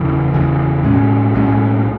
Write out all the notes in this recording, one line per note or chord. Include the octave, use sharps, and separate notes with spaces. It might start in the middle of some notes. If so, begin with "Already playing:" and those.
Already playing: F#1 E2 C#3 E3
F#1 E2 C#3 E3
B1 A2 G#3 C#4
B1 A2 G#3 C#4